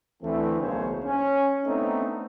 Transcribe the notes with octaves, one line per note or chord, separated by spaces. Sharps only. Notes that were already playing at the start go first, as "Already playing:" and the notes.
D2 E3 A3 C4
B1 C#3 A#3 C5 C#5
C#4
A3 B3 C4 D4 D#4